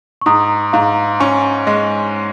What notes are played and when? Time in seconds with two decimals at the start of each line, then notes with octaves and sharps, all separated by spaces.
0.21 C#6
0.26 G#2 A#5 D#6
0.73 G#2 F5 A#5
1.20 C#4 G#5 C#6
1.67 G#3